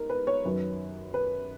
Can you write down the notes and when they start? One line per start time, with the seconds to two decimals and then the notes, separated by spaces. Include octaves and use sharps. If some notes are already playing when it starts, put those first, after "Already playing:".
Already playing: G#2 A#4
0.10 B4
0.27 C#5
0.45 F#2 D#3 F#3 B4
1.14 B4